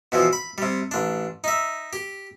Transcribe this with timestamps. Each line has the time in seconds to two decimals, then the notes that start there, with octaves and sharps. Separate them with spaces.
0.12 B2 E3 F3
0.33 B5
0.58 C3 G3
0.91 A1 D4
1.44 D#4 E5
1.93 G4